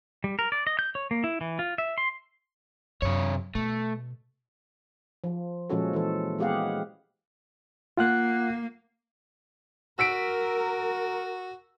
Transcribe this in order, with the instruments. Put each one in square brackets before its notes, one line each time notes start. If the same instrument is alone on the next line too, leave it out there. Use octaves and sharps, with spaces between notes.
[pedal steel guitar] G3
A#4
D5
D#5
G6
C#5
A#3
E4
E3
F4
E5
C6
[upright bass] F#2 [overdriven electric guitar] C3 C#5
[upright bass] B2 [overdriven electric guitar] A3
[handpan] F3
A#2 F3 G#3 C#4 F#4 A4
E3 A4
G#3 B3 G4 G#4 F5 F#5
[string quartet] A#3 [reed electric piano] F4 F#5 F#6
[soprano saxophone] F#4 [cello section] A#4 [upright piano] E6 B6 D7